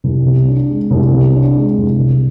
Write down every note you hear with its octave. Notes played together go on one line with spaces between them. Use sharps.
C2
C3
D4
G#3
C2
C3
D4
G#3
C2
C3